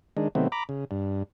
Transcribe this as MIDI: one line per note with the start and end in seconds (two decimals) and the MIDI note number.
0.17 0.28 51
0.17 0.28 56
0.17 0.28 62
0.35 0.48 48
0.35 0.48 51
0.35 0.48 54
0.35 0.48 57
0.35 0.48 59
0.35 0.48 60
0.52 0.64 82
0.52 0.64 83
0.52 0.64 86
0.69 0.85 49
0.91 1.23 43